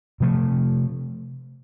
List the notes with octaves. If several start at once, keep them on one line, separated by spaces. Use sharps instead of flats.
C3 F3 A3